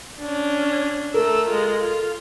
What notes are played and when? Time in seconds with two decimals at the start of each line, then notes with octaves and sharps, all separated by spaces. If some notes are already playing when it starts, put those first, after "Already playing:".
0.20 C#4 D4
1.14 A3 A4 A#4 E6
1.48 G#3 F4
1.81 F4